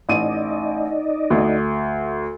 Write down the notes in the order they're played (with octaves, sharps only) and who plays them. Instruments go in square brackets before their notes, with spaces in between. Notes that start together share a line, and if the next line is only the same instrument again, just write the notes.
[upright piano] A1 D#7 [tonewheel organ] D#4 D5 D#5
[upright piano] D2